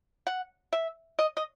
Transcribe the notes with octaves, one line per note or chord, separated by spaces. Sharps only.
F#5
E5
D#5
D#5